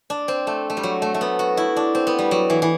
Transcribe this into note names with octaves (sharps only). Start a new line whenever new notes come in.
D4
C4
A3
A3
G3
F#3
A3
A3
B3
F#4
E4
D4
C4
B3
G3
F#3
E3
E3